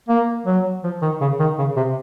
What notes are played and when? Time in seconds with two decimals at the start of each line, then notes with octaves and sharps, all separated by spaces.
0.09 A#3
0.46 F#3
0.84 F3
1.02 D#3
1.21 C#3
1.40 D#3
1.59 C#3
1.77 C3